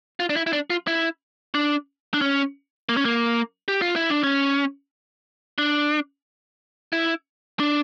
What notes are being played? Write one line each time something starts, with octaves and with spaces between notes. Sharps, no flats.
F4
D4
E4
E4
D4
F4
E4
D4
D4
C#4
A#3
C#4
A#3
G4
F4
E4
D4
C#4
D4
E4
D4